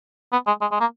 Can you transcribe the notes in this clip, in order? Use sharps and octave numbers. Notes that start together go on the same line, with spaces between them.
B3
G#3
G#3
G#3
A#3